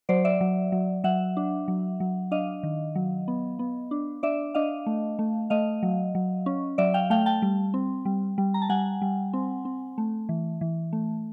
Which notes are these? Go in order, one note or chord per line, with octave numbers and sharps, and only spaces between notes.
F#3 C5 D5
D5 E5
F#3
F#3
F#3 E5 F#5
D4
F#3
F#3
D4 D#5 F5
D#3
F#3
B3
B3
D4
D4 D5 E5
D4 D#5 F5
A3
A3
A3 D#5 F5
F#3
F#3
C#4
F#3 D5 E5
F5 G5
A3 F5 G5
G5 A5
G3
C4
G3
G3
A#5
A5
G3 F#5 G#5
G3
C4
C4
A3
E3
E3
A3